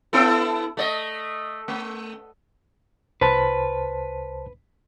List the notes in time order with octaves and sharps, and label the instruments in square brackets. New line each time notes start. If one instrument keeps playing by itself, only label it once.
[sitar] B3 E4 A4
A3 D5 D#5
A3
[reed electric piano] C2 C5 A5 [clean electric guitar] B4